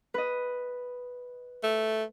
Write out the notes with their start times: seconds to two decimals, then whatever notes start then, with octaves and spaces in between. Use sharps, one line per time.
0.14 B4 D#5
1.63 A3